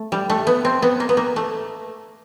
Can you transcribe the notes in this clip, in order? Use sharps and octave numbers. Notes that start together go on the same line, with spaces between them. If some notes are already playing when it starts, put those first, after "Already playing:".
Already playing: A3
G3
A3
B3
C4
B3
A#3
B3
A#3
A3